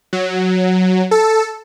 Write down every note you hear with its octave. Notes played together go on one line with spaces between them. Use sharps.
F#3
A4